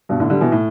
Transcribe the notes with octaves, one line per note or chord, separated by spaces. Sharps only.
G2 B2
A2 D3
D3 G3
B2 E3
A2